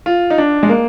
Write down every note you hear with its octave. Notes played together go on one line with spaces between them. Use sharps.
F4
D#4
D4
G#3
A#3